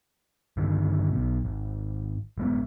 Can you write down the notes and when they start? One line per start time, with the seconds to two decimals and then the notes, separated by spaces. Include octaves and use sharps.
0.57 G2 D3 D#3
1.12 B1 B2
1.45 G#1
2.38 A1 G#3 B3